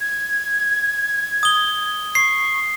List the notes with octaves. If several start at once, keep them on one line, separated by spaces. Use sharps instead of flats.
G#6
D#6 G7
C#6 C7